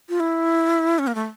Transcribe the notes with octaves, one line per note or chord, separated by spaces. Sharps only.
F4
E4
C#4
A#3
A3